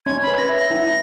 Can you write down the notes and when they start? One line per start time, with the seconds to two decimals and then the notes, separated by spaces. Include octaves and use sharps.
0.06 C#4 G#6
0.22 B5
0.27 B4
0.34 G#6
0.38 A#6
0.49 E5
0.54 A#6
0.71 E4